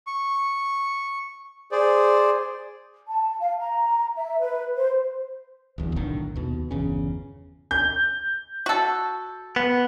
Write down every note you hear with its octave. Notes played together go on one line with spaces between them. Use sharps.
C#6
G#4 C5 D5
A5
F5
A#5
E5
B4
C5
D1 E2
B1 A2 D3 D#3
D#2 B2
G1 E2 C#3 C#4
G6
F#4 A4
B3